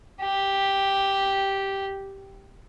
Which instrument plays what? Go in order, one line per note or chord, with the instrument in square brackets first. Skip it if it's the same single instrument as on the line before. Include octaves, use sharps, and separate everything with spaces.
[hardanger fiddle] G4